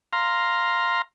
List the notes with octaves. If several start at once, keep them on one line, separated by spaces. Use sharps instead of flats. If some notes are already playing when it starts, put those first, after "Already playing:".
F5 A#5 C6